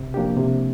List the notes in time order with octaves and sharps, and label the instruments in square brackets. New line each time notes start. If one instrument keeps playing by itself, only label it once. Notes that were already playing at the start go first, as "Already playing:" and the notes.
Already playing: [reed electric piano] C3
F3 A#3 D4 G4
C3